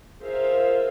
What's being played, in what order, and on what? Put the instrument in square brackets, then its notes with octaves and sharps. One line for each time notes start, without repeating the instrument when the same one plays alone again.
[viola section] F4 G#4 A#4 C5 E5 F5